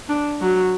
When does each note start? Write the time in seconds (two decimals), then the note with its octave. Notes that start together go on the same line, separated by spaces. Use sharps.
0.09 D4
0.41 F#3